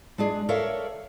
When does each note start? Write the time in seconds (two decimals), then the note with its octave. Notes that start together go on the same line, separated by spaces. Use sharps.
0.18 G#3 D4 G#4
0.49 A4 A#4 C#5 D5 E5 F5